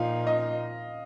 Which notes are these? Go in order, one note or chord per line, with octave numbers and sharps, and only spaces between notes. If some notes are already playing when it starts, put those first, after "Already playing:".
Already playing: A#2 F3 A#3 D#4 F5
D#5